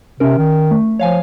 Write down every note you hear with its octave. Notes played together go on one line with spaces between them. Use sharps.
C3 C#4 A#4
D#3
A3
F3 C#5 F5 G#5